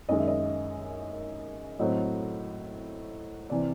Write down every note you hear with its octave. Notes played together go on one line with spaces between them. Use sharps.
F#2 D#3 G#3 D#5
E5
D#5
A2 F#3 A3 C4 D#5
C3 E3 D5